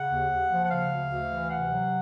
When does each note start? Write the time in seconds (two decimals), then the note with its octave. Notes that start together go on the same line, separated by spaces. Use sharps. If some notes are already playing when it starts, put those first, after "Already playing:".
Already playing: C#3 F#5
0.11 D#2
0.30 D#2
0.51 F3
0.65 F#5
0.71 C#3 F5
0.91 D2
1.10 D2
1.30 E3
1.50 C3 F#5
1.70 F#3